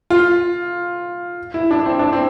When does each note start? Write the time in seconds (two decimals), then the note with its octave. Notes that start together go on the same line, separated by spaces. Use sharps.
0.10 F4
1.54 E4
1.71 D4
1.86 C4
1.99 D4
2.13 C4